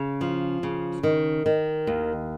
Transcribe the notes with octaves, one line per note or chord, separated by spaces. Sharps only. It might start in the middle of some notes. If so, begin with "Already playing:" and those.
Already playing: C#3
F3
C#3
D#3
D#3
D#2